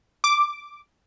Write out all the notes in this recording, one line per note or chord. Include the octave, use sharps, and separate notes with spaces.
D6